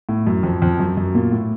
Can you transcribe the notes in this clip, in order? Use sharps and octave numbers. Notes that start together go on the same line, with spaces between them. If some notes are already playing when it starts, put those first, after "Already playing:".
A2
F#2
F2
F2
F#2
F#2
A#2
A2